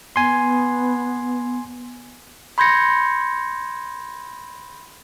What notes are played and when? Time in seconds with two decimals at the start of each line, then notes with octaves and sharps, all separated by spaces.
0.16 B3 G#5 C6
2.58 B5 C6 G6 G#6 A#6 C#7